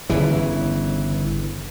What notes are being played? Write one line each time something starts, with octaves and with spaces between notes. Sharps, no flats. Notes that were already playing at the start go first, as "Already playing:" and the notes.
G1 C#3 E3